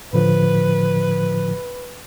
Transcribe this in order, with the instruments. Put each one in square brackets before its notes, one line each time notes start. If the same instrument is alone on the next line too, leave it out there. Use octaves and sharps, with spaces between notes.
[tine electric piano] A2 D3 F3 [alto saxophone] B4